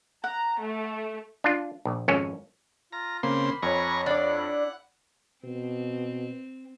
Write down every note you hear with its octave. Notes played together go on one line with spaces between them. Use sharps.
F#5 A#5
A3
D4 F4
A#1
G#1 F2 C#4 A4 C#5 G#5
F4 A#5
C#3 A#3 C4 B5 C6
F2 C#5 G#5 A#5 C#6
D4 D5 F#5
E4
B2 C4